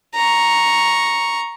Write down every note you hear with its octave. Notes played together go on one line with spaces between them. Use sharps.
A#5 C#6